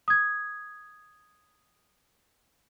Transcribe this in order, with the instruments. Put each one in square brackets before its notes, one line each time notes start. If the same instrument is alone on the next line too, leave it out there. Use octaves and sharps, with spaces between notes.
[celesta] D#6 G#6